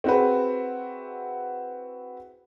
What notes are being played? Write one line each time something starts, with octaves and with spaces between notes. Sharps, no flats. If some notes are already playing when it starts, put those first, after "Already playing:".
C4 E4 F#4 G#4 B4